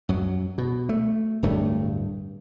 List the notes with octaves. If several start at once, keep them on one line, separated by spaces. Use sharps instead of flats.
F#2 F#3
B2
A3
D1 D2 G2 A3